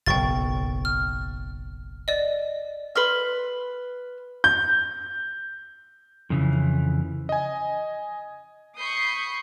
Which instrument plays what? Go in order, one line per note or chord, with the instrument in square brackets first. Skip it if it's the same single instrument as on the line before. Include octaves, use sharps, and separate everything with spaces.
[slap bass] F#1 B1 [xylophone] G5 C#6 A6
[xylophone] F6
D5 D#5
[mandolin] B4 C6 F6
[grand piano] G6
[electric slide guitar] F2 C#3 E3
[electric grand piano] D#5 G#5
[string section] B5 C#6 D#6 G6 C7 C#7